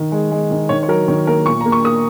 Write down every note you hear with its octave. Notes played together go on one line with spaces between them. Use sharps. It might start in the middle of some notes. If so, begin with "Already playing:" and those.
Already playing: D#3
G#3
G#3
D#3
D#3 C#5
C#5
F#3 A#4
D#3 C#5
A#3 A#4
A#2 C#6
A#3 A#5
C#6
A#3 D#6